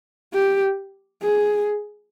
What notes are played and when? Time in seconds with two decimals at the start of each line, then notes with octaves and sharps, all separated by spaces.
0.34 G4
1.23 G#4